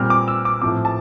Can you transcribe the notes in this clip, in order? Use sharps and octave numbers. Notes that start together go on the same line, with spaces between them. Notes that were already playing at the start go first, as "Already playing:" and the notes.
Already playing: A#2 G3 C4 F6
D6
E6
D6
A2 F3 C4 D6
A5